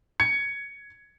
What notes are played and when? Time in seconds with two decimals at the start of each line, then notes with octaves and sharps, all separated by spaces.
0.20 G#6 C#7